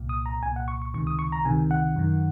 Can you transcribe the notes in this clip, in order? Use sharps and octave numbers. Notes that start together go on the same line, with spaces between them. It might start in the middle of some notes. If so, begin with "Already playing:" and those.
Already playing: C2 A#2
D#6
A#5
C2 A#2 G#5
F#5
C#6
C#6
C#2 C3 D#3 C#6
D#6
C#6
A#5
C#2 C3 D#3 G#5
F#5
F#2 D#3